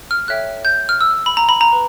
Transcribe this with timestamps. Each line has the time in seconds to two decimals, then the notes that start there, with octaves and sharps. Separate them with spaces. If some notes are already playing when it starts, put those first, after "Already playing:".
0.11 F6
0.28 A4 C#5 E5 G5 F#6
0.65 G6
0.89 F6
1.01 E6
1.26 B5
1.37 A#5
1.49 B5
1.61 A#5
1.72 B4